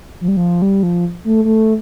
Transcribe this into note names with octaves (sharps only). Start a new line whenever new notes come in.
F3
G3
F3
G3
F3
A3
A3